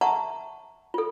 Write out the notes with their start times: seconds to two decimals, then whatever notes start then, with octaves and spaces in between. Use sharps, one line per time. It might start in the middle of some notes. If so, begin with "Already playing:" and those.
0.01 E5 F#5 A5 A#5 C#6
0.94 F4 A4